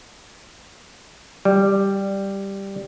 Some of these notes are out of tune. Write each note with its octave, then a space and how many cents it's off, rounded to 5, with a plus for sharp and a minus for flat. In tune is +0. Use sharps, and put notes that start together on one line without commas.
G3 +5